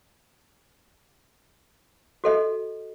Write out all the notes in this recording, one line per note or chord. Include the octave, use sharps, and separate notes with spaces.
F#4 A4 D#5